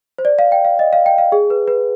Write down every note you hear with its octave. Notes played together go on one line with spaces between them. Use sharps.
C5
D5
F5
G5
F5
D#5
F5
G5
F5
G#4
B4
B4